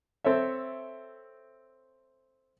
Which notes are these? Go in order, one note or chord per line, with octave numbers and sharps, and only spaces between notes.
C4 A4 C#5 E5